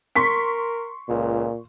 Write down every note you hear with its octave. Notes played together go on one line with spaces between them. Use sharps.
A#4 C6 C#6 B6
C#2 A#2